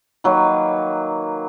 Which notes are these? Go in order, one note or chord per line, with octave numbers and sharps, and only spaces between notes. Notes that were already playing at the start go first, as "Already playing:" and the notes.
D#3 F#3 A#3 B4